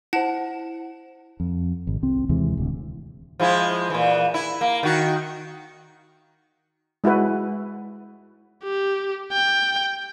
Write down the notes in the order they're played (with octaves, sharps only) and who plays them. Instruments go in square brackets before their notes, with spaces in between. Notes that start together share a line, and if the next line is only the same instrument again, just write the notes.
[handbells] E4 C5 [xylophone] F#5 A5 E7
[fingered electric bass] F2
G#1
C2 C4
D#2 C3 E3 G#3
D1 D2
[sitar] F3 G#3 E4
A#2 E3
E4
A#3
D#3 F#4
[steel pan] G#3 E4 F#4 B4
[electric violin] G4
G5